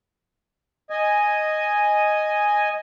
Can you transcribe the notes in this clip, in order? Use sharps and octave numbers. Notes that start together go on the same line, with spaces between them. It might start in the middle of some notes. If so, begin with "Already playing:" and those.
D#5 G#5